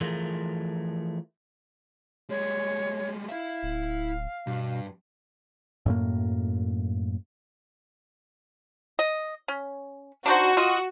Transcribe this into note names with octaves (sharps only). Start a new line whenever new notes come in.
E3 F3 A3 F4 G#4 A#4
G3 G#3 C#5
E4 E5 F5
D1
G2 B2
F#2 A2 A#3
D#5
C#4
D4 D#4 F#4 C5
F4 D#5